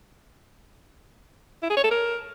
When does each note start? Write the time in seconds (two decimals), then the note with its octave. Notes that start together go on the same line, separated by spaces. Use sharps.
1.63 E4
1.70 G#4
1.77 C#5
1.84 A4
1.91 A#4